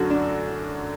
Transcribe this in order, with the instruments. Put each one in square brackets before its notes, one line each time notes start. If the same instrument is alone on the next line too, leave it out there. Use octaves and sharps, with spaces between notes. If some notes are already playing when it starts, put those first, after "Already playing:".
Already playing: [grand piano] F#2 D3 F#3 [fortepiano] F#4 A4
[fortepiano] D4